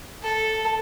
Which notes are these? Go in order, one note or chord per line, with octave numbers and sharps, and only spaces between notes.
A4